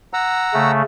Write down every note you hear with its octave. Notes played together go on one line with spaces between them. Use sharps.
F#5 A#5 E6
C#3 A3